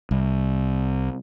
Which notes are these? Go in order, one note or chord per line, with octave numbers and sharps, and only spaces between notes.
C2